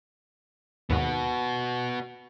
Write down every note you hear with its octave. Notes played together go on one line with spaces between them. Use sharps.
D#2 G#2 B3 F#4